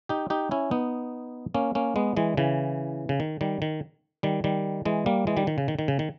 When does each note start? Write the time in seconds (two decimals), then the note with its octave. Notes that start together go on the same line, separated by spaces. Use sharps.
0.09 D#4 G4
0.30 D#4 G4
0.51 C#4 E4
0.71 B3 D#4
1.54 A#3 C#4
1.75 A#3 C#4
1.96 G#3 B3
2.17 E3 G#3
2.37 C#3 E3
3.09 C#3
3.20 D#3
3.41 D#3 G3
3.62 D#3
4.23 D#3 G3
4.44 D#3 G3
4.85 E3 G#3
5.06 G3 A#3
5.27 E3 G#3
5.37 D#3 G3
5.47 D#3
5.58 C#3
5.68 D#3
5.79 D#3
5.88 C#3
5.99 D#3